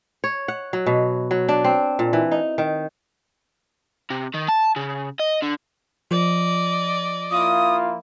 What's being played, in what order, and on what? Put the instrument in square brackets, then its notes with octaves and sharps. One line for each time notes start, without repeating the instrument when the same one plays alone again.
[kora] C#5
F#5
F#3
B2
F#3
D4
C4
A#2
E3
D#4
D#3
[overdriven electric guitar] C3
D#3
A5
C#3
D#5
D3
[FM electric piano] F3 [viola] D5 D#5
[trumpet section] A#3 E4 F4 [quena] D#6